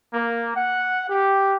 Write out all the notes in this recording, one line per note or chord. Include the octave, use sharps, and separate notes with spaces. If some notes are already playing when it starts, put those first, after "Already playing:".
A#3
F#5
G4